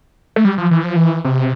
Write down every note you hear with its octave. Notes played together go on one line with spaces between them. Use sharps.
A3
G3
F3
E3
F3
E3
C3